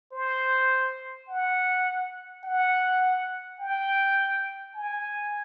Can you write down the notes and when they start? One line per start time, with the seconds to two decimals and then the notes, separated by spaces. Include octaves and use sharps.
0.13 C5
1.29 F#5
2.44 F#5
3.60 G5
4.75 G#5